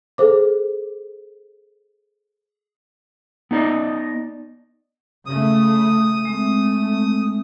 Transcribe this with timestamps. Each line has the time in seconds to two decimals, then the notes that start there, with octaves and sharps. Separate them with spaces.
0.18 G#4 A4 C5 D6
3.51 B3 D#4 D5 D#5
5.26 C#3 A3 D#6
6.25 G#3 A3 C4